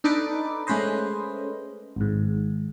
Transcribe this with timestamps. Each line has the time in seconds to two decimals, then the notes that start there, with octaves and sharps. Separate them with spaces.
0.04 D4 D#4 A4 B4 D6
0.67 G#3 A3 C#4 B4 C5 D#5
1.96 G#1 G#2